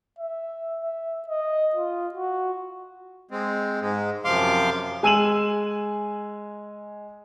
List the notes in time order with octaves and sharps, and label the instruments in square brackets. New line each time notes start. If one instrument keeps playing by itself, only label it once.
[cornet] E5
E5
D#5
F4
F#4
[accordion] G#3 C4
G#2 G#3
F#2 C3 F3 F5 C6 D6
[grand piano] G#3 G#5 E6 D#7 E7 F#7